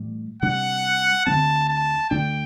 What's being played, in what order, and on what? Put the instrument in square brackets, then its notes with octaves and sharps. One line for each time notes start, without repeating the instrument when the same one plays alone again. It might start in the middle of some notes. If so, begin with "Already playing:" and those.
Already playing: [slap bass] A2 E3 G3
[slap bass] C3 G3 D4 [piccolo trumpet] F#5
[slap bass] D2 D3 G3 C4 [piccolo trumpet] A5
[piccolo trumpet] A5
[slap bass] D2 D3 A3 D4 [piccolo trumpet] G5